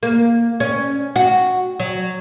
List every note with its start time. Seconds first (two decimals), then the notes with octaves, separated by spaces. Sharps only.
0.03 A#3
0.60 C#4
1.16 F#4
1.80 F#3